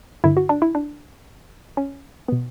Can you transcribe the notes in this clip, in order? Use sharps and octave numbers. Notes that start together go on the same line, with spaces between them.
G2 D3 E4
F#4
D4
E4
D4
C#4
B2 B3